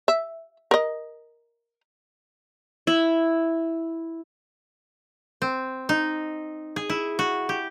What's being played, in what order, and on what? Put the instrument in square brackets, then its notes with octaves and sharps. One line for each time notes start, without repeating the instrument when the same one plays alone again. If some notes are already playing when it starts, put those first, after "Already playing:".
[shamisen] E5
A#4 D#5
[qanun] E4
[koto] C4
D#4
G#4
E4
F#4
G4